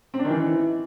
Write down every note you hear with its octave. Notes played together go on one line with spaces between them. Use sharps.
C4
D4
D#3
E3